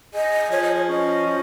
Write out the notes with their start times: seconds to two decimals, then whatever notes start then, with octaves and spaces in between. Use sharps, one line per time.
0.14 G#4 D#5
0.51 F3 C#5
0.63 D#5
0.76 C#5
0.89 C#4 D#5
1.26 F3